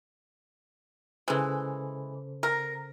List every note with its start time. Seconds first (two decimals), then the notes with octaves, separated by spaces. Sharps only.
1.28 C#3 E3 G#3 A4 C5
2.43 A#4